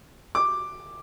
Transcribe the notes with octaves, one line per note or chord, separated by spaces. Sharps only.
D6